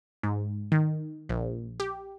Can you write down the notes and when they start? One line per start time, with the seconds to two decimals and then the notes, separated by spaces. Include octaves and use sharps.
0.23 G#2
0.72 D#3
1.29 A#1
1.80 G4